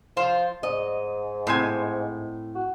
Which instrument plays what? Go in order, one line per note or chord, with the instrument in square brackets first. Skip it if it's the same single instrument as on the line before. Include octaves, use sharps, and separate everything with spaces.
[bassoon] F3 [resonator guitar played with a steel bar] F4 C5
[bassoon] G#2 [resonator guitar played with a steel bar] D#5
[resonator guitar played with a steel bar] A2 C4 G#5
[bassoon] F#4